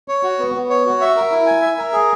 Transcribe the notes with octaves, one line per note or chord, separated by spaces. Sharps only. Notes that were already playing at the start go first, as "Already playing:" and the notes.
C#5
F#4
B3
B3
C#5
F#4
E5
A#4
E4
G#5
E5
A#4
G#4